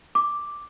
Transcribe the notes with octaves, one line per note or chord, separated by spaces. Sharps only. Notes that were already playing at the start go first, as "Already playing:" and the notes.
D6